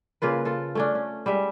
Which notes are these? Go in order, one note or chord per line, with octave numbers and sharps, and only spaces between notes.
C#3 A#3 F4 B4
F4 A4
A3 C#4 D4
C#4
G3 G#3 E5